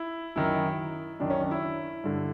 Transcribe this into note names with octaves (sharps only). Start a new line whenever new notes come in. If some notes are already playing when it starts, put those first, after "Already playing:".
Already playing: E4
F#2 D#3 E4
F#2 D#3 D4
C#4
D4
E4
G2 D3